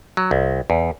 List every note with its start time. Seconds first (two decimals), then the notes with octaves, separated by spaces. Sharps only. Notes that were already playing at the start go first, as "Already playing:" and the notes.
0.17 F#3
0.31 C2
0.70 E2